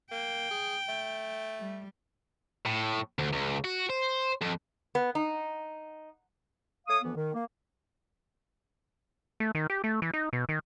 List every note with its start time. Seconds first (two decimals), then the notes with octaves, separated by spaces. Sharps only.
0.11 A#3 G5
0.51 G#4
0.89 A3
1.59 G3
2.65 A2
3.19 D2
3.33 C#2
3.65 F#4
3.90 C5
4.42 F2
4.95 B3
5.15 D#4
6.87 A3 C#5 F5 D#6
7.02 D2 E3 F3 B3
7.16 D#3
7.33 A#3
9.40 A3
9.55 D#3
9.70 G4
9.84 A3
10.02 E3
10.14 D#4
10.33 B2
10.49 D#3